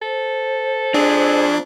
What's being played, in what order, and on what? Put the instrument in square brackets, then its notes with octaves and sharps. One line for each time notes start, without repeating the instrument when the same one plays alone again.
[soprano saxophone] A4 [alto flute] C5
[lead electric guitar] F3 C4 [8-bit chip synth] D4 [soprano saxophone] G#4